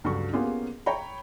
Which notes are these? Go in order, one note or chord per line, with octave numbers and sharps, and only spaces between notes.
C#2 G2 D3 F#3 C#6
A#3 B3 C#4 F4 G4 G#4
C#5 G5 A#5 B5